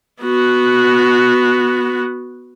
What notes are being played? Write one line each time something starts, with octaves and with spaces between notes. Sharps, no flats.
B3 F#4